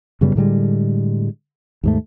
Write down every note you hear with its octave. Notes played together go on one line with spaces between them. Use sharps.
F#2 C#3 G3 B3
A2 D3 G3 G#3
D#2 G#2 A3